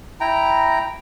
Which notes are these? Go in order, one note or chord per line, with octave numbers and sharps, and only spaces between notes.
E4 G5 A#5